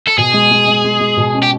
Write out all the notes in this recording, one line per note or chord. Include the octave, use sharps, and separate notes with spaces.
A4
B2 G#4
G#3
G#3
G#3
G#3
G#3
B2
C#4
G4